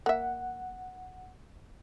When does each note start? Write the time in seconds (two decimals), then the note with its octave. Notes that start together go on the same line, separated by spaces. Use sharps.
0.06 A#3 E5 F#5